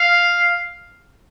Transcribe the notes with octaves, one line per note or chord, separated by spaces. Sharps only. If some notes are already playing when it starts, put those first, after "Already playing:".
Already playing: F5